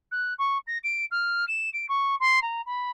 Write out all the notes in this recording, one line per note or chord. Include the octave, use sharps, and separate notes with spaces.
F#6
C#6
A#6
D7
F6
E7
D7
C#6
C6
A#5
B5